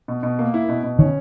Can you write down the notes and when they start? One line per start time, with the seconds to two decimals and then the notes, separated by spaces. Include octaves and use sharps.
0.08 B2
0.23 B2
0.39 A#3
0.54 E4
0.69 B2
0.83 B2
0.99 D#3 C#4